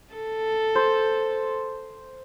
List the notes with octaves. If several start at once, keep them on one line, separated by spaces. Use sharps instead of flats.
A4
C5